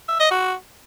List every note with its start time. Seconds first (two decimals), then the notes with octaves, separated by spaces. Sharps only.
0.09 E5
0.20 D#5
0.31 F#4